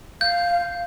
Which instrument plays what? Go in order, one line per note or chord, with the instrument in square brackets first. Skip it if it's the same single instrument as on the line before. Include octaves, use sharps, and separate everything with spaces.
[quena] F5 [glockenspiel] G6